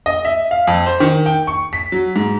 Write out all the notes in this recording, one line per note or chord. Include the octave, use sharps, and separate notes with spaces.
D#5
E5
F5
F2
C5
D#3
G5
C#6
B6
F#3
G#2